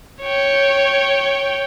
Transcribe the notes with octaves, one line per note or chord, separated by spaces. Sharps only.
C#5 G5